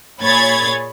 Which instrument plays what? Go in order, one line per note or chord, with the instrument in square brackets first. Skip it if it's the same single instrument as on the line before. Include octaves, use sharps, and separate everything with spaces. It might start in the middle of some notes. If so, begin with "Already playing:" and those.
[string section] A#2 G#4 C#5 B5 G#6 A6